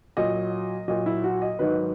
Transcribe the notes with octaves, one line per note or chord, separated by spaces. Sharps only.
A#2 F#3 D#5
A#2 F#3 D#5
E4
F#4
D#5
G#2 D#3 F#3 B4